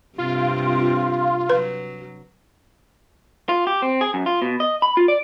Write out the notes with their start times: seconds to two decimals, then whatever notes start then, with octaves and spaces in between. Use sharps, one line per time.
0.18 G2 C3 C4 F4
1.50 F#3 B4
3.49 F4
3.67 G4
3.82 C4
4.01 G#4
4.14 F#2
4.26 F4
4.42 B2
4.60 D#5
4.82 B5
4.97 F4
5.08 D5